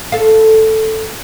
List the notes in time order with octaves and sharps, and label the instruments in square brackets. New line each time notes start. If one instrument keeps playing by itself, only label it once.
[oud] A4 F5